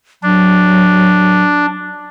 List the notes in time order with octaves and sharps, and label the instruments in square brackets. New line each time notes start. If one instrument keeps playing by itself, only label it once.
[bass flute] F#3 [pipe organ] D4